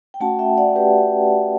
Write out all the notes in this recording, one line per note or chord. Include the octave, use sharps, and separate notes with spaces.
G5
A3 C#4 F#4 F#5 A5
E5 G5
D5 F#5
G4 B4